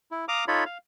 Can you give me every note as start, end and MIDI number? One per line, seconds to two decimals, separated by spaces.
0.11 0.25 64
0.28 0.44 77
0.28 0.44 82
0.28 0.44 86
0.28 0.44 87
0.28 0.44 89
0.48 0.64 63
0.48 0.64 65
0.48 0.64 69
0.48 0.64 73
0.48 0.64 83
0.65 0.78 77